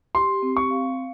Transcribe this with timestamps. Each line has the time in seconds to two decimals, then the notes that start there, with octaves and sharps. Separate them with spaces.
0.15 G4 C6
0.42 C4
0.57 C#6
0.71 F5